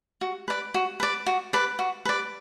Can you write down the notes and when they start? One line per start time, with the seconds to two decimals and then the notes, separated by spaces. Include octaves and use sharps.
0.21 F#4
0.48 B4 D5
0.74 F#4
1.00 B4 D5
1.26 F#4
1.53 B4 D5
1.79 F#4
2.05 B4 D5